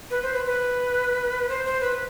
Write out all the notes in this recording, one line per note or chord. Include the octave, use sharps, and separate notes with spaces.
B4
C5
B4
B4
C5
C5
B4